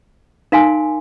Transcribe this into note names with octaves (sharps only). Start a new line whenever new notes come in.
D#4 A#4 F5 G#5 C6